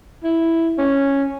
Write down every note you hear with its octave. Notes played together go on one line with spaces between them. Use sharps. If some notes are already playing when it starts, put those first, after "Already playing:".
E4
C#4